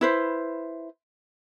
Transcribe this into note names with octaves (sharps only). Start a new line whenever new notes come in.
E4 B4 C5